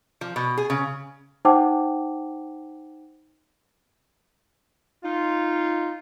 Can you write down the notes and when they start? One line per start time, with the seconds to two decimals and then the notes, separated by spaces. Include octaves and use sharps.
0.21 F3
0.36 B2
0.57 G#4
0.70 C#3
1.45 D#4 C5 F#5 G5 A5 D6
5.05 D#4 F4